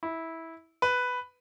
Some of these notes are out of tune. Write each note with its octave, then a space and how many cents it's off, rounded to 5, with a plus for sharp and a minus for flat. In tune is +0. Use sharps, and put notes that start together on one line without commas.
E4 -15
B4 +5